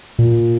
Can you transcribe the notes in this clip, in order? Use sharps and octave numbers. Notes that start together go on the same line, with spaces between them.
A#2